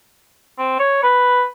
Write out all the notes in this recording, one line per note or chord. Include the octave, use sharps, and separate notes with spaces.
C4
C#5
B4